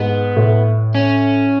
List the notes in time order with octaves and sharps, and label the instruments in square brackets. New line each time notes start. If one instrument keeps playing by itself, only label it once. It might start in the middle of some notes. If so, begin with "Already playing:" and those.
Already playing: [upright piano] G#2 [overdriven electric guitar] B3
[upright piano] A2
[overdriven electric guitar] C#4